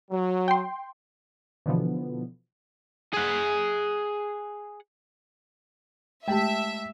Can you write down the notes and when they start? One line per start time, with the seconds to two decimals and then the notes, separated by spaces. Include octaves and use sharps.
0.11 F#3
0.48 G5 C6
1.66 B2 D3 E3 F3 B3
3.13 G#4 F#5
6.28 G#3 A3 G4 E5 G5 A5